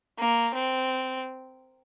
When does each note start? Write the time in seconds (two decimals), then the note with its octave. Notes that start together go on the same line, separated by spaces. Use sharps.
0.19 A#3
0.55 C4